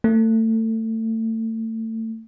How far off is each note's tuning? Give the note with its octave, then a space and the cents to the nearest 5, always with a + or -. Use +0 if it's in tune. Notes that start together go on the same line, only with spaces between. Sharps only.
A3 +30